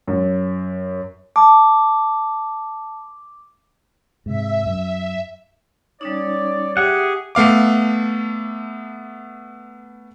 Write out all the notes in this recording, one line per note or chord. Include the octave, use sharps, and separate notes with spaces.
F#2
A5 D6
G#2 C3 E5
F#2
G3 C#4 D#4 C#5 D5
G4 G#4 E5 F#5
A3 B3 F5 D6